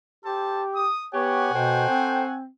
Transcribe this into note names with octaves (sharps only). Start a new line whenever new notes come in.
G4 A4 C5 A5
D#6
B3 F#4 G4 C#5 F#5 G#5
B2 A4 C5 G5
C4